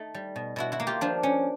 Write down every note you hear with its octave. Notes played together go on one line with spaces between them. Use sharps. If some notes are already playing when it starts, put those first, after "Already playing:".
Already playing: A3 D#4
G3
B2
B2 E4 F#4
E4 F#4
A#3
F4 G4
F3 D4
C#4